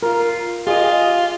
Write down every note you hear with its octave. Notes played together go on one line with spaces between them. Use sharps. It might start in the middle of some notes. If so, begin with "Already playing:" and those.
F4 A#4
F4 G4 G#4 D#5